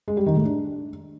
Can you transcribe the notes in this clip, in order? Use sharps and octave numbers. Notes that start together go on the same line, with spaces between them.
G#3
G3
D#3
A2
D4